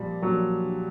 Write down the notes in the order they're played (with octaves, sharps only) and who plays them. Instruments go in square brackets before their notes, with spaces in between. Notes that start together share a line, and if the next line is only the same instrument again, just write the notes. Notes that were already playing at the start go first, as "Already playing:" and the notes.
Already playing: [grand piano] A#2 F3 G3
A#2 F3 F#3